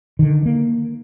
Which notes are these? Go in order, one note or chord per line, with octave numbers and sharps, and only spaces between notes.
D3 D#3
A#3